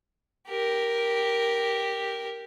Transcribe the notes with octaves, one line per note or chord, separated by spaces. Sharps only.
G4 A#4